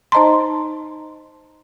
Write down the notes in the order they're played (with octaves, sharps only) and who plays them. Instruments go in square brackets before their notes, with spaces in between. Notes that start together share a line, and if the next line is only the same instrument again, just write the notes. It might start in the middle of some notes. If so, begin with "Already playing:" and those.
[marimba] D#4 C5 D#5 A5 A#5 C6